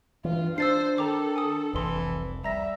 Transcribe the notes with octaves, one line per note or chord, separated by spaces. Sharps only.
G2 E3 F4
D4 C5 E6 A6 C7
D#3 A4 C5 A#5 D6
G#5 D#6
F1 C2 E3 C6 E6
G3 E5 A#5 A#6